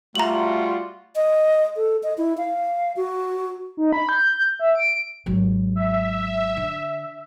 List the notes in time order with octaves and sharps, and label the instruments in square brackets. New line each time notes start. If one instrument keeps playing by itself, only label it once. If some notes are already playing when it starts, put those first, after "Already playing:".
[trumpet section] G3 F4 F#4 [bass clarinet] A3 [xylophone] A#5 F#7
[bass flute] D#5
A4
D#5
E4
F5
F#4
[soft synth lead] D#4
B5
G6
E5
D7
[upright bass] G#1 F#3
[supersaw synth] E5
[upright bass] D3